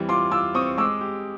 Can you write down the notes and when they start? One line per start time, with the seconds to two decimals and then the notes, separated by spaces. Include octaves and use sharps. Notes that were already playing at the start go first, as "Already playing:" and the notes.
Already playing: E3 G3 C4
0.09 F4 C6 D6
0.31 F4 D6 E6
0.55 C4 C#6 D#6
0.78 G#3 D6 E6
1.01 G4